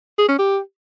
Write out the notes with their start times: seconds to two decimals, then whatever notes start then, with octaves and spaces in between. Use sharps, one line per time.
0.18 G#4
0.29 C#4
0.39 G4